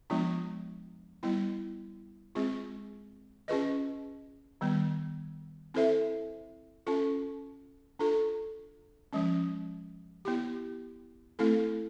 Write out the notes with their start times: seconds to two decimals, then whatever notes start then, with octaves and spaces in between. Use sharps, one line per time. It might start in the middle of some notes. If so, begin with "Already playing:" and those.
0.10 F3 G#3 B3 D4 F4
1.23 G3 B3 E4
2.35 G#3 C4 F4 G#4
3.48 C#4 F4 G#4 B4 D#5
4.61 D#3 G3 B3
5.74 C4 E4 A4 C5 E5
6.87 C#4 F4 A4
7.99 D4 F4 A4
9.13 F3 G#3 C#4
10.25 B3 E4 G4
11.39 A3 C4 E4 A4